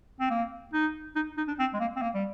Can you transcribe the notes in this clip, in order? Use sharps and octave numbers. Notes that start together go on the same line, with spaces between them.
C4
A#3
D#4
D#4
D#4
D4
C4
G#3
A#3
C4
A#3
G3